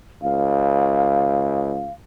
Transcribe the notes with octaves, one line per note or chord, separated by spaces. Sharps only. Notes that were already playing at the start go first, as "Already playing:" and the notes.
C#2 F5